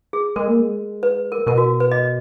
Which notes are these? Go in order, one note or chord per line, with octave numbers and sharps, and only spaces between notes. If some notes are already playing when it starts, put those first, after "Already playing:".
G#4
G#3 A#4
A#3
G#3
B4
A#4
B2 A#4
F#4
B4
D#5